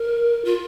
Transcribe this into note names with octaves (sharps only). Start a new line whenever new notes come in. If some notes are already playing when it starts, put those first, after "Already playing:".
Already playing: A#4
F4